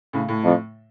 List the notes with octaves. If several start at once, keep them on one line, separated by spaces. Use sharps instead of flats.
A2 C#3
A2
F2